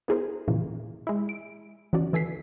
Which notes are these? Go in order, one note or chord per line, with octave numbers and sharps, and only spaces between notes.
B3 E4 G#4 A#4 C5
A#2 C#3 E3 F3 A#3
G#3 E4
D7
E3 C#4 D#4 F#4 D5
D#2 E3 A4 G#5 B6 C7